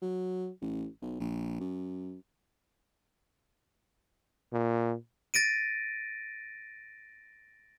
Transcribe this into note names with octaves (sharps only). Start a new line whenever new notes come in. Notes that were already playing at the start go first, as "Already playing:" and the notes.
F#3
A1
B1
A#1
F#2
A#2
A6 A#6 D7 D#7